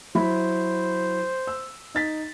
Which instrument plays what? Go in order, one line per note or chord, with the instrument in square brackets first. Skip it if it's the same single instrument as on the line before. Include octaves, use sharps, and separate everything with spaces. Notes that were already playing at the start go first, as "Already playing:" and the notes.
[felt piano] F#3 E4 B5 [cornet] C5
[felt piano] E6
D#4 A6 B6